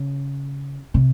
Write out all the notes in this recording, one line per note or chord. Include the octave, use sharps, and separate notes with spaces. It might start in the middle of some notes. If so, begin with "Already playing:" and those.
Already playing: C#3
C3